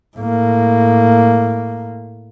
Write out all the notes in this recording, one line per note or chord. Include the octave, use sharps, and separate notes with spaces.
A2 A#3